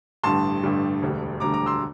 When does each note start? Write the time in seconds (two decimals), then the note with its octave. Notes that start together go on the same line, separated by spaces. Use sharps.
0.23 A1 G2 D3 G3 A5 C6
0.63 A1 G2 D3 G3
1.02 E1 D2 D3 G3
1.40 E1 D2 D3 G3 A#5 D6
1.54 A#5 D6
1.66 C6 E6